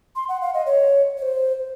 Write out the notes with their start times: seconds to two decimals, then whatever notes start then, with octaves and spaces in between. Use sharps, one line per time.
0.16 C6
0.29 F#5
0.42 F5
0.54 D#5
0.66 C#5
1.17 C#5
1.22 C5